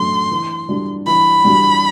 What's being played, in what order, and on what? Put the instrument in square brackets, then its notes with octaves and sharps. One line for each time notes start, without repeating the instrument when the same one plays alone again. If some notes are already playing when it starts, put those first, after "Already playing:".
Already playing: [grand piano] F#2 F#3 A3 D4 [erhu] C6
[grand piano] E3
G3 D4 F#4
[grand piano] E3 [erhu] B5
[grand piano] G3 D4 F#4